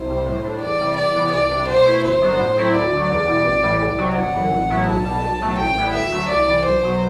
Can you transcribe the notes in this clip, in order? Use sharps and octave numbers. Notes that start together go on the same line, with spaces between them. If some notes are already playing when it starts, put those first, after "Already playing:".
Already playing: C2 C5
C3 G3
A2
G3 D4
E2 D5
C3 G3
E2 D5
C3 E3 B3
C2 D5
C3 G3 D4
B2 C5
A3 E4
G1 C5
F#2 F#3 B3 D4
A2
F#3 C4 E4
D2 D5
D3 F#3
E2
B2 G3
A1
A2 E3 G3
C2
C3 F#3
G1 F#5
F#2 E3
A1
A2 F#3 B3 E4
B1 A5
B2 G3
B1
A2 F#3 A3
A1 G5
A2 G3 B3 E4
D2 E5
D3 F#3 A3
C2 D5
C3 E3
B1 C5
B2 F#3